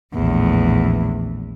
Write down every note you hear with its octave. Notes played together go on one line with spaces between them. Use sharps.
A#1 E2 A2 E3